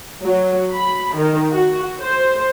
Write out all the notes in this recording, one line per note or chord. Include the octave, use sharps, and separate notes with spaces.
F#3
B5
D#3
F#4
C5